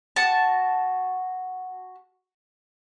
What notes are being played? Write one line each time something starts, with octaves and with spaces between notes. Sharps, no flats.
F#4 A5